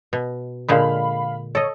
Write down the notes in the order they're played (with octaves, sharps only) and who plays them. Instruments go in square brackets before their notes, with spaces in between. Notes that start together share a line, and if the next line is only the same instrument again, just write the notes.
[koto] B2
[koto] A#2 D3 G#3 [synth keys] F5 B5
[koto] A4 D#5 [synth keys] C#5